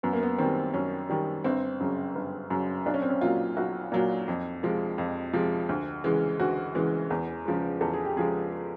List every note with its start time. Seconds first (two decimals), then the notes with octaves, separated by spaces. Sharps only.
0.03 F#2 B3
0.13 A#3
0.23 B3
0.38 D#3 G3 C4
0.74 F#2 C#4
1.10 D#3 G3
1.44 G1 C4
1.80 F#2 C#3 F#3
2.15 G1
2.50 F#2 C#3 F#3
2.86 B1 D4
2.94 C#4
3.02 C4
3.10 C#4
3.21 A#2 F#3 F4
3.57 B1 F#4
3.92 A#2 F#3
4.28 F2
4.63 C3 F3 G#3
4.98 F2
5.33 C3 F3 G#3
5.69 D2
6.04 C#3 E3 G#3
6.39 D2 F#4
6.75 C#3 E3 G#3
7.10 E2
7.46 C#3 F3 G#3
7.81 E2 A4
7.93 G#4
8.05 G4
8.16 C#3 F3 G#3 G#4